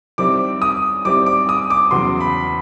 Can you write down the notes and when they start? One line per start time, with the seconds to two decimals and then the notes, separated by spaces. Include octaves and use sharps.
0.18 D#3 G3 C4 E4 D6
0.62 D#6
1.05 D#3 G3 C4 E4 D6
1.26 D6
1.49 D#6
1.70 D6
1.91 E2 C#3 F#3 B3 C6
2.20 B5